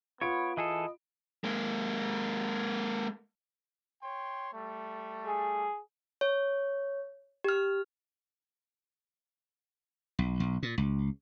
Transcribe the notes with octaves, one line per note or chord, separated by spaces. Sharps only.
B3 F4 C#5 B5 D7
E3 G#4 A4 D#5
G#3 A#3
C#5 G5 C6
G3 A3
G#4
C#5
G4 F6
B1
B1
A#2
C#2